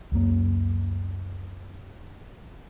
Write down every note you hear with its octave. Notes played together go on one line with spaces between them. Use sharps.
C#2 F#2 A#3